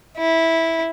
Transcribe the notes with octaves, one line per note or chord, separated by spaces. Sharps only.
E4